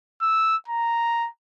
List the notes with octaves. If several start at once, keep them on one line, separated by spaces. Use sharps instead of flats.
E6
A#5